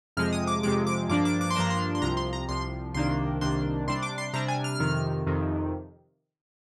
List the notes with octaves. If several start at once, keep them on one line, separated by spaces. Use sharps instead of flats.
F2 C3 F3 G#3 F6
D#6
D6
F2 C3 F3 G#3 D6
D6
G2 F3 A#3 D4 D6
D6
D6
C6
G2 F3 A#3 D4 A#5
C6
C6
C2 C3 F3 A#5
C6
A#5
C2 C3 F3 C6
C2 C3 D#3 A#3 D4 C6
C2 C3 D#3 A#3 D4 C6
C3 G3 D4 C6
D6
C6
C3 G3 D4 A#5
G#5
F6
F2 C3 D#3
F2 C3 D#3